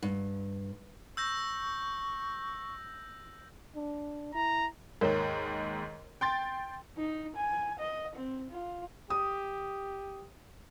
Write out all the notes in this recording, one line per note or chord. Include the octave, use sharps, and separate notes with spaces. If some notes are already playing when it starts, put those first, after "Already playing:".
G2
C#6 E6 G6 A#6
D4
E4 A#5
D#2 G#2 A#4 C#5
G5 C6 A6
D#4
G#5
D#5
C4
F4
G4 D#6